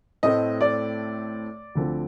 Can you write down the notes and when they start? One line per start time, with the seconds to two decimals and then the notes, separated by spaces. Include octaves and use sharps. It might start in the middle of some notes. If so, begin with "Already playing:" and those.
0.23 A2 A3 C4 D#5
0.61 D5
1.75 D2 D3 F3 C4